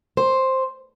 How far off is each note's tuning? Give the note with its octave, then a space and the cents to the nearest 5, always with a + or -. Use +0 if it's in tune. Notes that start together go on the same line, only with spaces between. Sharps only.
C5 +5